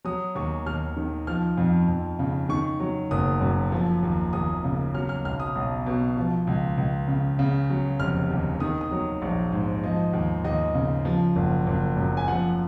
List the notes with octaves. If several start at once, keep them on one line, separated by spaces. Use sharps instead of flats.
F#3 D#6
D#2 C#6
D#2 F6
D#3
F3 F6
F2
F2
C#3
D#3 C#6
F#3
F#1 D#6
F#2
F3
D#2
D#2 D#6
C#3
F#3 F6
F6
B1 F6
D#6
B1
B2
F3
C#2
C#2
C#3
C#3
F#3
F1 F6
D#2
D#3 D#6
D#6
F#3
A#1
G#2
F3 D#5
D#2
D#2 D#5
C#3
F3
F#1
F#1
F#2
G#5
F3 F#5